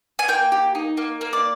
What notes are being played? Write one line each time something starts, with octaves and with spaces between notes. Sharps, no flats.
G#5
A#3 G5
G4
D#4
A#3
A#3
D5